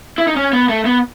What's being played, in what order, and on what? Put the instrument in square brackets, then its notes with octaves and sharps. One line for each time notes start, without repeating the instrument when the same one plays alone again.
[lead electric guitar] E4
D#4
C#4
B3
A3
B3